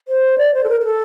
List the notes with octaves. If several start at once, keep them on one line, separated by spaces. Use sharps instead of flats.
C5
D5
C5
A4
A#4
A#4
A4